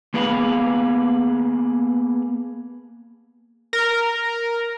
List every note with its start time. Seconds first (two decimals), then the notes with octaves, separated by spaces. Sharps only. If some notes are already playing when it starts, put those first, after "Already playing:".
0.14 A#3 B3 G#4 B4 F5
3.73 A#4